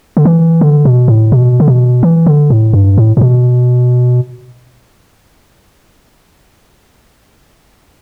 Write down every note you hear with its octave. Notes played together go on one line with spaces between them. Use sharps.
D3
E3
D3
B2
A2
B2
D3
B2
E3
D3
A2
G2
A2
A2
B2